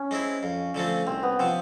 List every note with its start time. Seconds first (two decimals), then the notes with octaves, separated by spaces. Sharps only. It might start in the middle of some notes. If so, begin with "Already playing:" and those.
Already playing: C#4
0.11 G#3 C4 E4
0.43 F2
0.75 D3 F3 A3 C4
1.07 C2 C4
1.23 B3
1.39 C3 F3 C4